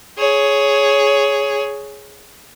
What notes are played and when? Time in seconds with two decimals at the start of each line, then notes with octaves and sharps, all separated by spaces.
0.18 G#4 C#5